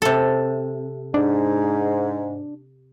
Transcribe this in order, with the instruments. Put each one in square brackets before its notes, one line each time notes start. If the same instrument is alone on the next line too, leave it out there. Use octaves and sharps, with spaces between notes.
[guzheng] C3 A4
[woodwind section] G#2 [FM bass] D4